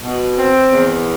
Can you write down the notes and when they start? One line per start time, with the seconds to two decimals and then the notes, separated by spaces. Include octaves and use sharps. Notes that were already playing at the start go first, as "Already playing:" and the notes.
0.02 B2
0.37 C4
0.70 E2